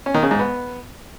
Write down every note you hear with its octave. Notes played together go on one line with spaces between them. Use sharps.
C#4
D#3
C#3
G#2
B3